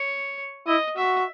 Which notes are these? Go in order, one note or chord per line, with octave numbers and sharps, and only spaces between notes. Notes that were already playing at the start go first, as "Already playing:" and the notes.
Already playing: C#5
E4 D#5
F#4 E5